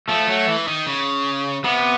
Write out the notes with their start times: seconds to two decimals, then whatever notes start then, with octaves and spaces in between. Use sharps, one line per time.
0.08 F3 A3
0.28 F#3
0.48 E3
0.67 D#3
0.87 C#3
1.64 C3 B3